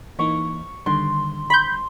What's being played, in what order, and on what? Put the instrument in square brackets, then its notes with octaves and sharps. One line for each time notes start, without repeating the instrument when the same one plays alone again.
[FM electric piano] E3 A#3 D#4 [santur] F5 C#6
[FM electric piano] D3 D#3 G3 [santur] C6
[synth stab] B5 G6 [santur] C6